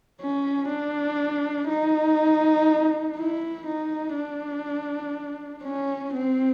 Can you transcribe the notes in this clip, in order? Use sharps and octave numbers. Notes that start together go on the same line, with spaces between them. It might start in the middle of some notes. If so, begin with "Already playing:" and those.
C#4
D4
D#4
E4
D#4
D4
C#4
C4